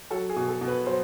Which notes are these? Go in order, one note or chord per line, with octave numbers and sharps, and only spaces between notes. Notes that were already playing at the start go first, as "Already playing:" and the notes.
F#3 A4
G#4
B2
A4
B2
B4
F#3 C5